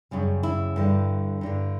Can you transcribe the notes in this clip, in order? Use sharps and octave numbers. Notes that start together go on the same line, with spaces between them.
F#2 C#3 G3
E4
G2 D3 G3
G2 D3 G3